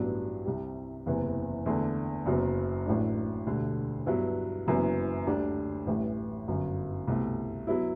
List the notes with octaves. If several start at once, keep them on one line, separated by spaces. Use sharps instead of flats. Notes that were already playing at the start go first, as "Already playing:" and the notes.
Already playing: A1 G2 F#3 B3 D4
C2 C3 G3
F#1 E2 C3 E3
E2 D3 A3
F#1 F#2 F#3 B3
A1 A2 F#3 A3 D4
E1 D2 D3 G3
G2 F#3 B3 E4
F#1 F#2 E3 B3
D2 D3 G3 D4
A1 A2 E3 G3
G1 F#2 F#3
C2 B2 A3
F#3 B3 E4